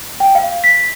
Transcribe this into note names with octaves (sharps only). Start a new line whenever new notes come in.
G5
F5
B6